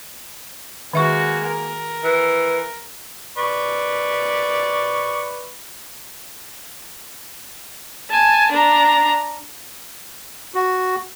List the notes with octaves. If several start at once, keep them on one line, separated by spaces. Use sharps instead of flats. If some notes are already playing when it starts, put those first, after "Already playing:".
D#3 G#3 A#3 F#4 E5 C#6
A#4
E3
B4 D5 C#6
G#5 A5
D4 A#5
F#4